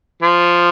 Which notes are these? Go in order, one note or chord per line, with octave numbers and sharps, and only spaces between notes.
F3